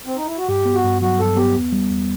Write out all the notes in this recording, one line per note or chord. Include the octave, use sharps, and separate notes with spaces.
C4
D#4
E4
F#4
G2 G4
B3
F#4
G2
F#3 F#4
G2 A4
B3 G4
E2
G3
E2